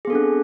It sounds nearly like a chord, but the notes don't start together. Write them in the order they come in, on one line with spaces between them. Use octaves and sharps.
G#4 B3 A4 D4 C4